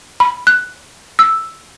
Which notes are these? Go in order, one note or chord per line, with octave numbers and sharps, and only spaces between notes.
B5
F#6
E6